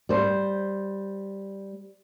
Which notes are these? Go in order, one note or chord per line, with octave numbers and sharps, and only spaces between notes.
G3 C5